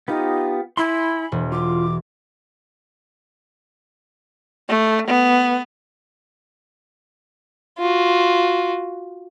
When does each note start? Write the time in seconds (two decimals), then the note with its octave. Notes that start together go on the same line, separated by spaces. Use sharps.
0.08 B3 D#4 F4 G4
0.77 E4 G#5 B5 C6
1.32 E1
1.52 F4 D6
4.69 A3
5.07 B3
7.79 F4 F#4